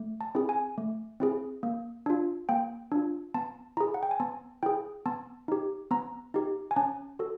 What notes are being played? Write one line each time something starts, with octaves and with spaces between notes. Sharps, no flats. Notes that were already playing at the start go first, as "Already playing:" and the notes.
Already playing: A3
A5
C4 E4 G#4
G#5
A3
C4 E4 G#4
A#3
D4 F4
A#3 G5
D4 F4
B3 A5
E4 G#4 A#5
F#5
G5
G#5
B3 A5
E4 G#4 G5
B3 A5
D#4 G4
B3 A#5
D#4 G4
G#5
C#4 A5
F#4 A4